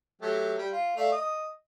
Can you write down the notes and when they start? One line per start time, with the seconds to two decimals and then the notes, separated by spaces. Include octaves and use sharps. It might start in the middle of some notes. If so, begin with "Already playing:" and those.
0.22 F#3 A3 G4
0.58 G3
0.71 F4
0.97 A3 D5 F5
1.12 D#5 D#6